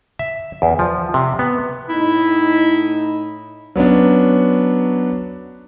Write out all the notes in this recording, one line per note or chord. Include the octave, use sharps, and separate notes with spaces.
E5
E2
F3
C3
B3
A2 D#4 E4
F#3 B3 C#4 D4